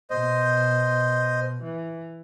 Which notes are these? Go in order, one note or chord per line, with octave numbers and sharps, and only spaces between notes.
B2 C5 D#5
E3